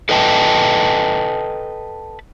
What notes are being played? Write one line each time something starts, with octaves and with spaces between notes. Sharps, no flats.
A4 B4 D#5 G5 A5